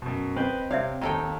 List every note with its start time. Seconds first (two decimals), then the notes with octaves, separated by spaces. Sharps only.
0.02 F#2 B2
0.36 C4 B4 D#5 G6
0.71 C3 C#5 D5 E5 F5
1.02 D#2 D#4 A4 G5